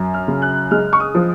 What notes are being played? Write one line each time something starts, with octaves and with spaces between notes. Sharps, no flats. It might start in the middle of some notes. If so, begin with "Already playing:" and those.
Already playing: F#2
F6
C#3
F#6
G#3 F6
C#6
D#6
F3